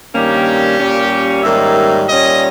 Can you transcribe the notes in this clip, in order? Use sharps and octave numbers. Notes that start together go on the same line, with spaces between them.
G2 D#3 G3 A#3 C#4 G4
A#2 G3 A#3 C#4
G#2 D#3 G3 A#3 C#4 E5
A#2 G3 C#4 D#5